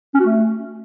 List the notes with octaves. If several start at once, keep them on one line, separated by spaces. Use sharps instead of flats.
C#4
F#4
A3